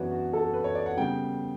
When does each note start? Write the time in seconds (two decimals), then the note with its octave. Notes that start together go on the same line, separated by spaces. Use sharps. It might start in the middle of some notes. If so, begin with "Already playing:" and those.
Already playing: F#2 E3 B3 D4 F#4 B4 C#5 D5
0.12 F#4
0.33 A4
0.54 B4
0.64 C#5
0.75 D5
0.86 F#5
0.97 C#3 G3 B3 G5